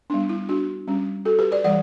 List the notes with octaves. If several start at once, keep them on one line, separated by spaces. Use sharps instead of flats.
G3 B3 D4
E4
D4 F#4
G3 C#4
F#4 A4
G4 B4
B4 D5
E3 G3 D5 F#5